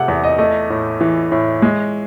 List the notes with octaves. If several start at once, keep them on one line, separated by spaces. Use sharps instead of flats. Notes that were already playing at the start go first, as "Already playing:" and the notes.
Already playing: C3 A3 F#5
E2
D#5
A3 D#5
A2
E3
A2
G#3